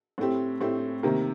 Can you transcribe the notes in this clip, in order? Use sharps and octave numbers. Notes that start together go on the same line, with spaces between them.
A2 A3 C4 G4
A2 A3 C4 G4
C3 D#3 A#3